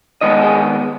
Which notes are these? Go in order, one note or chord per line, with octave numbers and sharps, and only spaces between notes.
D#3 G#3 B3 D#5
G#4